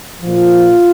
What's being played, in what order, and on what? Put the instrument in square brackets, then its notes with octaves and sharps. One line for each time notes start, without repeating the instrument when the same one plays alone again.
[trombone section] A#2 F3 F4